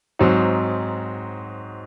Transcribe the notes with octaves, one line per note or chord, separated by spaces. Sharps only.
G#2 F#3 C4 D#4